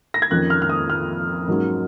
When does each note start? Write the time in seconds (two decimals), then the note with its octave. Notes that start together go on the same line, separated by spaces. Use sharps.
0.14 A#6
0.22 G#6
0.30 F2 D#3 A#3 C#4 F#6
0.50 F6
0.62 F6
0.70 D#6
0.90 F6
1.48 G#2 F#3 A#3 C#4